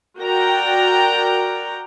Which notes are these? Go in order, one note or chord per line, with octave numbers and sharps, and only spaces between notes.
F#4 A#4 D5 G5 A#5